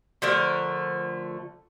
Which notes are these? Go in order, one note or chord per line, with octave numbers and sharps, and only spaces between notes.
D3 F3 A3 A#4